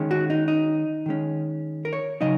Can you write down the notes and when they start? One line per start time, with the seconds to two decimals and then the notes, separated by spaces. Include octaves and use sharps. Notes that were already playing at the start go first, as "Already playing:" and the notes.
Already playing: D#3 G#3 C#4
0.11 F#4
0.30 D#4
0.48 D#4
1.06 D#3 G#3 C#4
1.85 A#4
1.93 C#5
2.21 C#3 F#3 D#4 D#5